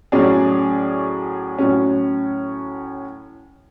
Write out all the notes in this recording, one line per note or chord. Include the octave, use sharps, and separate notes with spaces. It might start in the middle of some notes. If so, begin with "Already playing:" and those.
A2 F#3 C#4 G#4 D5
A2 F#3 C#4